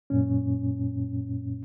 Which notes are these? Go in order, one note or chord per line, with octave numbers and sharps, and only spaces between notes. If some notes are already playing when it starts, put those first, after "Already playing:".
F#2 A#2 C#4